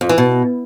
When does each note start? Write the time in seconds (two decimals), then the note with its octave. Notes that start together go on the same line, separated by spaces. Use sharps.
0.01 F2
0.09 E3
0.18 B2